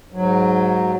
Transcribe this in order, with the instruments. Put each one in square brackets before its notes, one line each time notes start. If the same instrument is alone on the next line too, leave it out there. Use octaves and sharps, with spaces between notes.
[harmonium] G#2 F#3